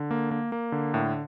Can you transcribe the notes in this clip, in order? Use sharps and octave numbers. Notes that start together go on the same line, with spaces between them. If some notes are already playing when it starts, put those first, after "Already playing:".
Already playing: D3
A#3
A#3
A#3
D3
A2